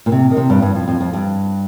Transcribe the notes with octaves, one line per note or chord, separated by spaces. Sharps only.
A#2
C3
D#3
C3
G2
G2
F2
F2
F2
G2